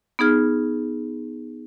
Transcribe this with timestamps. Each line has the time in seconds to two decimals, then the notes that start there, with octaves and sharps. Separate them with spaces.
0.19 B3 D#4 G#4 F6